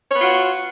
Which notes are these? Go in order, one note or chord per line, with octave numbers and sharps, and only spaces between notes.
B3 F4 F#4 C#5